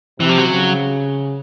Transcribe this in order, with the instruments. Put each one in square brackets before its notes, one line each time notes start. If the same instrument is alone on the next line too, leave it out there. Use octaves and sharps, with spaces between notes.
[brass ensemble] C3 [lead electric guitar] E3
[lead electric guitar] F3
F#3
[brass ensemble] C#3